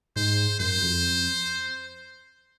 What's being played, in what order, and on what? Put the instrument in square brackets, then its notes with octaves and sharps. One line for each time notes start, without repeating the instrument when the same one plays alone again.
[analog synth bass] G#2 [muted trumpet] C5
[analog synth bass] F#2 [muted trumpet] C5
[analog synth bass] F2